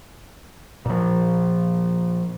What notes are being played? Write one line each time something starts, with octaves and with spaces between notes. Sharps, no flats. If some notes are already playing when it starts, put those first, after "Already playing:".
A#2 F3